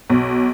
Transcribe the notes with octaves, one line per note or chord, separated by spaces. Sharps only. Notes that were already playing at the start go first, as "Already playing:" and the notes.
B1